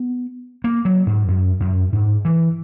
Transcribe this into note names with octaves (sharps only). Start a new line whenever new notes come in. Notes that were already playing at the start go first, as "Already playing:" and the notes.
Already playing: B3
A#3
F#3
G#2
F#2
F#2
G#2
E3